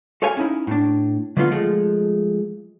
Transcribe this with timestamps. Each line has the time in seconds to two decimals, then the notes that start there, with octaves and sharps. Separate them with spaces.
0.22 F#4 A4 C#5 F5 G#5
0.37 C#4 D#4 E4
0.67 A2 D4
1.37 D3 F#3 A3 B3 C#4 F4
1.51 F3 G#3 A3